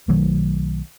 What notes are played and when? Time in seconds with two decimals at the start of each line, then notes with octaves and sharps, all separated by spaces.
0.08 B1 D#3 F#3 A3